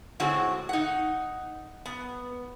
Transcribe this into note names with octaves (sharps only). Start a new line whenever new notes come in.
A2 D3 G#3 C4 F#4
D#4 F#5
B3